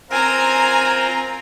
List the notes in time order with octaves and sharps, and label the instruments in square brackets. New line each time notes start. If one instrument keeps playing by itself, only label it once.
[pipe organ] C4 F4 A#4 [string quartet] G#5 A#5